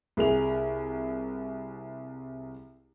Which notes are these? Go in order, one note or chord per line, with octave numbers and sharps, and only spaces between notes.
C2 G#4 A#4 F7